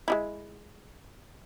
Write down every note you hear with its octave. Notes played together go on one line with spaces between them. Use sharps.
G#3 D#4 E4